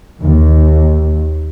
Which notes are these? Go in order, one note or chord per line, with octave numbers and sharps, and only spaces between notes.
D#2